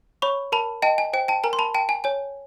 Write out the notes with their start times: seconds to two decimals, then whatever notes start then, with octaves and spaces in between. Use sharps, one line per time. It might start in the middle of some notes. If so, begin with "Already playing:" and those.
0.22 C#5 B5 C#6
0.52 A#4 A5 B5
0.82 D#5 G5 A5
0.98 G#5
1.13 C5 G5
1.28 G5 A5
1.43 A#4 G#5 A#5
1.53 C6
1.59 A5 B5
1.75 G5 A5
1.89 G#5
2.04 C#5 G#5